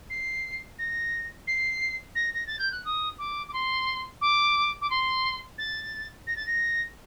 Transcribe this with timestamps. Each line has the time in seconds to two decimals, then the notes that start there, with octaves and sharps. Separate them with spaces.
0.10 C7
0.79 A#6
1.47 C7
2.15 A#6
2.34 A#6
2.47 A6
2.59 G6
2.72 F#6
2.85 D#6
3.19 D6
3.48 D6
3.53 C6
4.21 D6
4.81 D6
4.90 C6
5.58 A6
6.27 A#6
6.36 A6
6.46 A#6